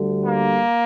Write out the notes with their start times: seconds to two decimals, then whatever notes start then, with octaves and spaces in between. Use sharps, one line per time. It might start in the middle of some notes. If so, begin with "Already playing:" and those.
Already playing: D2 D3 G3
0.25 A#3